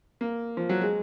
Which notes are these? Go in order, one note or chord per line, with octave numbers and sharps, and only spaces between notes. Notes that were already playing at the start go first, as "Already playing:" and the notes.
A#3
F3
F#3
G#3